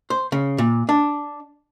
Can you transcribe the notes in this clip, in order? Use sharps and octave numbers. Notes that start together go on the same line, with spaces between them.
C5
C#3
A#2
D4